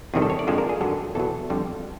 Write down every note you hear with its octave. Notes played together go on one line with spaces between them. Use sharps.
E2 C3 D#3 G3 G#4
A4
C#5
D5
F2 D3 F3 G#3 C5
A#4
G#4
F#2 D3 F#3 A4
E2 B2 F#3 A4
F2 D3 G3